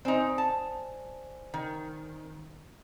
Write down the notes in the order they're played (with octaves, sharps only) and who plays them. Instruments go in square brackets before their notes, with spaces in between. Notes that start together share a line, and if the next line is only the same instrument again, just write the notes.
[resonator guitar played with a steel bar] C4 D#4 [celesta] C5 D5 G#5
[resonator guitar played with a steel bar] A5
D#3